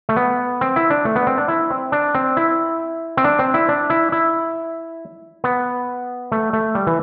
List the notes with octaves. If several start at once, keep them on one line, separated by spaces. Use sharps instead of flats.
A3
B3
C4
E4
D4
A3
B3
C4
D4
E4
C4
D4
C4
E4
C4
D4
C4
E4
D4
E4
E4
B3
A3
A3
G3
E3